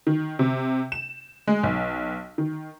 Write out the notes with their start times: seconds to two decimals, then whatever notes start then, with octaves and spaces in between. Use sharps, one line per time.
0.07 D#3
0.39 C3
0.92 E7
1.47 G#3
1.63 B1
2.38 D#3